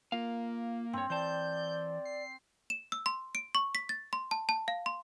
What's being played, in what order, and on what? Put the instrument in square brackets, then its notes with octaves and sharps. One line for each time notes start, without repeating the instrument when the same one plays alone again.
[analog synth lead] A#3 [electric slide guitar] F4 F5
[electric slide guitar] G2 C#5 [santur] C4
[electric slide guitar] E3 C5 A5 [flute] D5 [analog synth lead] G6
[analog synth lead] C7
[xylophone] E7
E6
C6
D7
C#6
B6
A6
C6
A5
A5
F5
C6